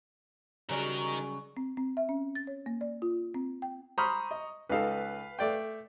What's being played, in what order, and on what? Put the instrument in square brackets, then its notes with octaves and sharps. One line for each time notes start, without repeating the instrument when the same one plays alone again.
[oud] C#3 F#3 G3 [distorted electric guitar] D#4 A#4
[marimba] C4
C4
E5
C#4
A6
C#5
A#3
D5
F4
C4
G5
[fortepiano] C5 B5 F6 [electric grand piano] A#5 C#6 D#6
[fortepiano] D#5
[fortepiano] C#2 D#4 A4 [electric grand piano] B4 F5
[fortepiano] A3 D5 G5